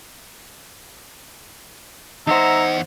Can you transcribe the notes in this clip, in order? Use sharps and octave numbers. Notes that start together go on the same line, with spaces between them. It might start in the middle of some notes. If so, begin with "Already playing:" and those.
E2 D#4 C5 E5 F#5 A#5